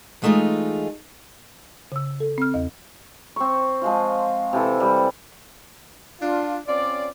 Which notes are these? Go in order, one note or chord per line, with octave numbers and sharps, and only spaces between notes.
E3 G#3 A3 D#4 F4 G#4
C#3 E6
A4
C4 F6
E2 D#5
C4 C#6
F3 G#3 F4
C3 E3 A4
G3
D4 F4
C4 C#4 F4 D5